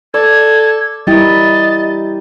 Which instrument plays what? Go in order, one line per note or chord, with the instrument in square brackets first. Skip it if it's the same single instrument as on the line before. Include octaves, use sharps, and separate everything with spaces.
[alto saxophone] A4 [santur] D5 [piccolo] G#6
[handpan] G3 E4 [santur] G4 A#4 [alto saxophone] D#5 [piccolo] A6